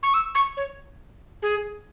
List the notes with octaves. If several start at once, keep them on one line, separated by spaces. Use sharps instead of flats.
C#6
E6
C#6
C#5
G#4